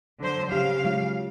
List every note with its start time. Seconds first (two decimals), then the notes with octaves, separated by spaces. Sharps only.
0.20 D3 F#3 C5
0.52 C#3 G4 F5
0.84 F#3 G#3 F4